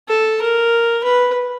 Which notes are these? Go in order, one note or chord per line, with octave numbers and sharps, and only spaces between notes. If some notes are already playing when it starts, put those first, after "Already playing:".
A4
A#4
B4